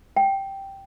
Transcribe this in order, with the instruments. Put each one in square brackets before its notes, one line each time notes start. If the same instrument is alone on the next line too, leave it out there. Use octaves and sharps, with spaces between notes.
[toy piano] G5